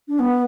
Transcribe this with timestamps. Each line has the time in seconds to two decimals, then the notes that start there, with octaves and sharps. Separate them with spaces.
0.08 D4
0.19 B3